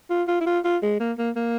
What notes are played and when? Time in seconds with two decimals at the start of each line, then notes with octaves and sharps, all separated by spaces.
0.10 F4
0.28 F4
0.41 E4
0.46 F4
0.65 F4
0.83 G#3
1.00 A#3
1.18 A#3
1.36 A#3